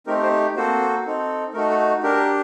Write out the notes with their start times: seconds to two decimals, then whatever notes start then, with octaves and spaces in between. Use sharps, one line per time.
0.07 A3 C4 D#4 G4 A#4
0.23 C4 C5
0.56 A#3 C4 F#4 A4 C5
1.05 C4 D#4 A4
1.54 A3 D#4 F#4 A4 A#4
1.70 A4
2.03 D4 G4 A#4